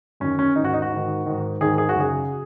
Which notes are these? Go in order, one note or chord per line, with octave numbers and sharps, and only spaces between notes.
F#2 D#3 C#4
C#4
G#2 D#3 D#4
F#4
D#4
F#4
G#2 D#3
G#2 D#3
G#2 D#3 G#4
G#4
F#4
F#2 C#3 G#4